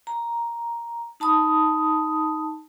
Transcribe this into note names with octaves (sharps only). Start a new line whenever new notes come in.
A#5
D#4 A5 B5 D#6